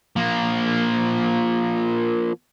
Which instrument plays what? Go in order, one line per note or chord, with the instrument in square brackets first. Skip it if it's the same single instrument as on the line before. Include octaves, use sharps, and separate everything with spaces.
[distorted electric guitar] F3 A#3